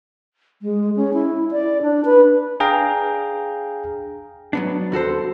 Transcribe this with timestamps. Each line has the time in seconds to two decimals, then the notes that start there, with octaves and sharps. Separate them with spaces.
0.62 G#3
0.96 C#4
1.13 E4
1.51 D5
1.82 D4
2.05 B4
2.60 D4 G#4 F5 G5 A#5
4.53 F#3 B3 D4
4.92 D#2 F#4 A4 C5